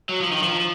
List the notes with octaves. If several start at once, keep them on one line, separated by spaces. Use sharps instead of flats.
F#3
F3
D#3
F3